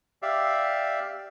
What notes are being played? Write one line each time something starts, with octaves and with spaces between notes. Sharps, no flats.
G4 D5 E5 F5